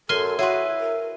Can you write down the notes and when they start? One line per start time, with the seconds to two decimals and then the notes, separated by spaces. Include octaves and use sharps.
0.09 F#2 A4 G#5 C6 F6
0.39 E4 F#4 G#4 B4 C#5 F#5 C6
0.80 A#4